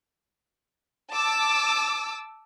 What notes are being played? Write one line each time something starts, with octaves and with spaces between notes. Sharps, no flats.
A5 D6 E6